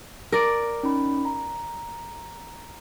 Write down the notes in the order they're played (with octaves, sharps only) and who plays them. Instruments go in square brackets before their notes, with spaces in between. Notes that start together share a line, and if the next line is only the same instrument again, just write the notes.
[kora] A#4 D5
[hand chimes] C#4 D#4 B5
A#5